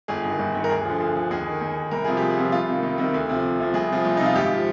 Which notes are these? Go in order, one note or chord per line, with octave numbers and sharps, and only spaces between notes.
G1 G#4
G2 D#3
G1
G2 D#3
A#4
D2 G#4
D3 F3
D2
D3 F3
D#2 G#4
D#3
D#2
D#3
C2 A#4
C3 F3 G#4
C2 G4
G#4
C3 F3
C2 F4
C3 D#3
C2
C3 D#3
D2
C3 F3
D2
C3 F3
C2 G#4
C3 F3
C2
C3 F3 D#4
F4
G#1 G4
F3